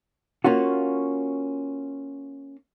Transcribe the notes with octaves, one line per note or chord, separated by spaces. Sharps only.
A#3 C#4 F4 F#4